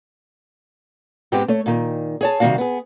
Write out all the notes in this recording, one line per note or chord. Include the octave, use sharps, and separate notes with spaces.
G#2 G#3 B3 C4 G4
A3 C#5
A#2 D#3
G#4 C#5 A5
C3 D#3 G3 D4 F#4 F5
B3 G#4